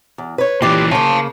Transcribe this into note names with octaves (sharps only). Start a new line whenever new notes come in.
E2
B4 C#5
A#2 E3 G4 B4 D5
C#3 A#3 F5 A5